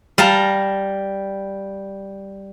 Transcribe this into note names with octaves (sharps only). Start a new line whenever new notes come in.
G3 F5 A5 A#5